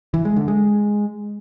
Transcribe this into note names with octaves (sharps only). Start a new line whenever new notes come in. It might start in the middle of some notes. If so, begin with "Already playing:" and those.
E3
G#3
D3
G#3